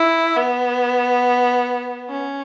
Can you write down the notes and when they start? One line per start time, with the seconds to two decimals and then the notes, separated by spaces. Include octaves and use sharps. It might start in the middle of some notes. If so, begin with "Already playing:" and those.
Already playing: E4
0.36 B3
2.09 C#4